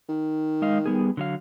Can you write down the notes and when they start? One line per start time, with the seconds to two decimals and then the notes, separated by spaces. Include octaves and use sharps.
0.09 D#3
0.62 G#3 D#5 F5
0.86 G3 B3 G#4
1.17 D3 F#3 F5